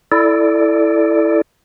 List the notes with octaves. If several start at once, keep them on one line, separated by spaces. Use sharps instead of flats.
E4 A4 D5